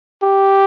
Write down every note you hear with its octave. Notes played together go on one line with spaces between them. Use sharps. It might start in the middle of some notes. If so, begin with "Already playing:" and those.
G4